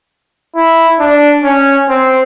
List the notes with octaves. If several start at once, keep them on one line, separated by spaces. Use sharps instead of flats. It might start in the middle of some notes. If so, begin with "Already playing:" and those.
E4
D4
C#4
C4